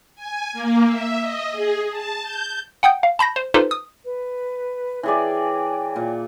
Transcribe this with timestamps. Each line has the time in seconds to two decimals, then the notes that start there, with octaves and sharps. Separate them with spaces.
0.16 G#5
0.53 A#3
0.87 E5
1.20 D#5
1.52 G#4
1.90 A5
2.22 G6
2.83 F#5 G5 D#6 G6
3.03 F5
3.19 A5 B5 G6 A#6
3.36 C5
3.54 D#4 F4 G4 A4 B4 C5
3.71 D#6
4.04 B4
5.03 E3 G#4 C#5 D5 G5 G#5
5.96 A#2